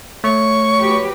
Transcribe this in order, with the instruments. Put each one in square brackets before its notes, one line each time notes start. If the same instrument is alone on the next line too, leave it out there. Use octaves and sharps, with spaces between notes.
[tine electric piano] A3 [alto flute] C#5 [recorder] C#6
[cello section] F#4 G4 B4